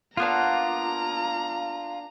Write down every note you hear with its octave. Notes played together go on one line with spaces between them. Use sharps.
A#3 B3 D4 F4 A#5